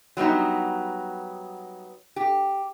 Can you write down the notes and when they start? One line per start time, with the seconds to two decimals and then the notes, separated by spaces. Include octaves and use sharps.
0.17 F#3 G3 B3 D#4
2.16 G4